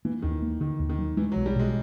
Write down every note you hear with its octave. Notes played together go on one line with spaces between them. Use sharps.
E3 A#3
D#2 D#3
A#3
D3 D#3
D#2
D#3
F#3
E3 G#3
F#3
B1
G3
B2 G#3